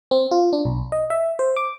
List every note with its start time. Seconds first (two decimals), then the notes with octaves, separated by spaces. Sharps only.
0.11 C4
0.31 F4
0.53 D4
0.65 B1
0.92 D#5
1.10 E5
1.39 C5
1.56 D6